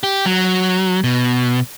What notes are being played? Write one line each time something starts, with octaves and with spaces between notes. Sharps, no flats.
G4
F#3
B2